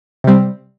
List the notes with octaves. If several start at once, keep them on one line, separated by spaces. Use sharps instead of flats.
C3 G3 C4